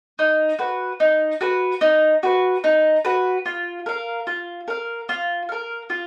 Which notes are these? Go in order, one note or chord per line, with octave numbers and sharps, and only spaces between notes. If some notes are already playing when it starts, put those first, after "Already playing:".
D#4
F#4 B4
D#4
F#4 B4
D#4
F#4 B4
D#4
F#4 B4
F4
A#4 F5
F4
A#4 F5
F4
A#4 F5
F4